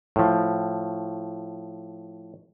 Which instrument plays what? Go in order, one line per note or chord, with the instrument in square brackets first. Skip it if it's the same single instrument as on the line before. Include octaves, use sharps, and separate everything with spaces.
[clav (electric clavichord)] A2 F3